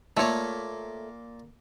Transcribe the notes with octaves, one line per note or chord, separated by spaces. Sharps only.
A#2 A3 A#3 C#5